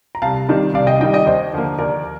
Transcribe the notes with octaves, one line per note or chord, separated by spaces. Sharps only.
A#5
C2 F5 A5
C3 D#3 G3
C2 D5 F5
D#5 G5
C3 D#3 G3 D#5 G5
D#5 G5
D#2 C5 D#5
D3 F3 A#3
D#2 A#4 D5